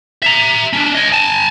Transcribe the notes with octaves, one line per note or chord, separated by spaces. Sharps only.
E5 A#5
C#4 D4
C#5 D#5
G#5 A5